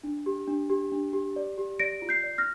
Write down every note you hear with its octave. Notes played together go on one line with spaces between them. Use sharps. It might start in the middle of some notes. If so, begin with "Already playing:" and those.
D4
G4
D4
G4
D4
G4
D5
G4
D5 A#6 D7
F4
G6 C7
D5
F6 A#6